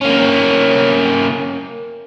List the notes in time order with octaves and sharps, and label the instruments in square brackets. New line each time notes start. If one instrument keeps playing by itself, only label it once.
[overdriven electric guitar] A#3 C#4